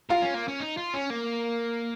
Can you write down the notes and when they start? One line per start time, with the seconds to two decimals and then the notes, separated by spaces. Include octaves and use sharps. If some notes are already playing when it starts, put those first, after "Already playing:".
0.09 F4 A#4
0.22 C#4
0.34 A#3
0.48 C#4
0.60 D#4
0.77 F4
0.94 C#4
1.10 A#3